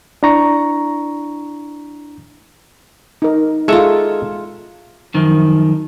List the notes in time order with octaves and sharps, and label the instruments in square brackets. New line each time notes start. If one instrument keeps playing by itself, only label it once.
[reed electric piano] D4 E4 A#5 C#6
[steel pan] D#4 A#4
[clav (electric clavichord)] G#3 A4 E5 [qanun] F4 A#5 C#6 [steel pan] G#4
[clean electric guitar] F#2 D#3 F3